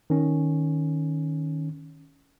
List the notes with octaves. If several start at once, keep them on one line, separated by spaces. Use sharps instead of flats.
D#3 C#4